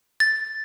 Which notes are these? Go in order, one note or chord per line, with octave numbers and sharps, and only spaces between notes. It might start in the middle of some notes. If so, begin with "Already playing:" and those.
A6